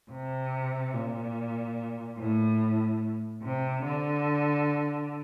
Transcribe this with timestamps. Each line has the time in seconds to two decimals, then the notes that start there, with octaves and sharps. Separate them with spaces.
0.11 C3
0.94 A#2
2.18 A2
3.43 C3
3.84 D3